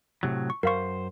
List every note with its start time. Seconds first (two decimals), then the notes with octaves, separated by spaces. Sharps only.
0.23 A2 C3 F#3
0.50 C#6
0.63 F#2 A#4 C5 F5 C#6